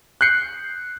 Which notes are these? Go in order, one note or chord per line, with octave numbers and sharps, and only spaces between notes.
F#6 G6 C7 C#7